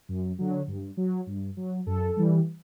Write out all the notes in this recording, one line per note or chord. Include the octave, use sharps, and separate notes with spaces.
F#2
D3 F#3
G2
F#3
G2
F#3
F#2 A4
E3 G3